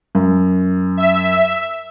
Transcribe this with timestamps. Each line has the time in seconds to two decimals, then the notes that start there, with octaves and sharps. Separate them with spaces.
0.15 F#2
0.97 E5